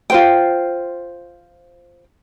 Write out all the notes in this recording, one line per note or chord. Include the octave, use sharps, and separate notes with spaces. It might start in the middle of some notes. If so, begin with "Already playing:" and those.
F4 C5 G5